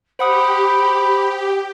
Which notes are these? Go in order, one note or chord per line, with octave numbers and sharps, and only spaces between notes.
G4 C5 F#5 B5 D#6